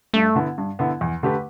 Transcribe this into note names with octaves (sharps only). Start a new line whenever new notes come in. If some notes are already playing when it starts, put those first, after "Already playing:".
G2 A3
D3 B3 E4
G2
D3 B3 E4
E2
D3 A3 G4 B4